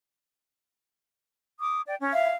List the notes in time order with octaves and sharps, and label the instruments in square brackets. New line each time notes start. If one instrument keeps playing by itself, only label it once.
[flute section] D6 D#6
D5 G5
C#4
[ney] E5 [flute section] F5